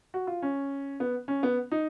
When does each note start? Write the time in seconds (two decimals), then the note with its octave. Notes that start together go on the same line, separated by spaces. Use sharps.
0.14 F#4
0.27 F4
0.42 C#4
1.00 B3
1.28 C#4
1.43 B3
1.72 D#4